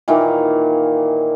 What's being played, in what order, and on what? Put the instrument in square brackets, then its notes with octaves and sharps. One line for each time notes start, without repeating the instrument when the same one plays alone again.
[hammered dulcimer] A#2 D#3 E3 A#3